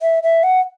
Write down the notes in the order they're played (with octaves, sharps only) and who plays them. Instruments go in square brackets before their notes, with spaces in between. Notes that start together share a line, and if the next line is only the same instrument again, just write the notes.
[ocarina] E5
E5
F#5